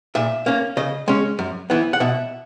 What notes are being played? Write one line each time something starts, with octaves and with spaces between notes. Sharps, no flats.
A#2 E5
A#3 C#4
C#3 D#5
G#3 C#4
F#2
E3 B3
F#5
B2 E5